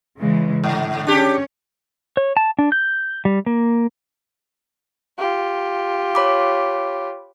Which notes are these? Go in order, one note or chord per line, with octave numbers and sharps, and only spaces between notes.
C#3 E3 G#3
G#2 D3
C#4 D4 G4 C#5
C#5
A5
D4
G6
G3
A#3
F4 G4
C#5 B5 D6